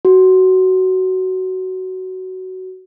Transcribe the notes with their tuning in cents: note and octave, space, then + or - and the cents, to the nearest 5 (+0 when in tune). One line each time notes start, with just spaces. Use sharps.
F#4 +15